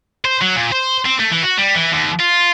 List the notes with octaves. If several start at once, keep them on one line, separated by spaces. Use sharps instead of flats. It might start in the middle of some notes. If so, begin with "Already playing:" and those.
C5
F#3
A#2
C5
C4
A3
E3
F#4
G3
E3
D#2
F4